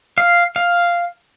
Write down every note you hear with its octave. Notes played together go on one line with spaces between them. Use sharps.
F5
F5